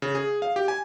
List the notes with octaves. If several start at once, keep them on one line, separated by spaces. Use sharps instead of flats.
C#3
G#4
F5
G4
G#5